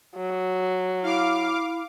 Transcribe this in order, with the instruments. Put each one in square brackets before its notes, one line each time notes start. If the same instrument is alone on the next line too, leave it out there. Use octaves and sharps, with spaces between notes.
[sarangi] F#3
[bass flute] E4 [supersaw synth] F5 D6